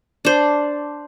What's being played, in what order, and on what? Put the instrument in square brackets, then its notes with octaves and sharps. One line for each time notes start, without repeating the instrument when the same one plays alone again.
[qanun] D4 C5